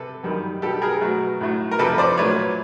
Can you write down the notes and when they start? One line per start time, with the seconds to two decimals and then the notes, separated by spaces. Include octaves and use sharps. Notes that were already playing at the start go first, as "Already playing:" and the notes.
Already playing: C3 A4 B4
0.24 F#2 D#3 G3
0.62 B2 G3 G4 A4
0.82 G#4 A#4
1.01 B2 F#3 A3
1.40 A2 F#3 A3
1.71 A#4
1.79 F2 C3 E3 G3 A4 B4
1.98 C5 D5
2.17 A#2 F#3 A3 B4 C#5